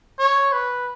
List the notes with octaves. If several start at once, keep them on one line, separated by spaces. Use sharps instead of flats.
C#5
B4